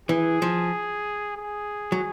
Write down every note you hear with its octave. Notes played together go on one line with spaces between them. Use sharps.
E3 G#4
F3
G#4
F#3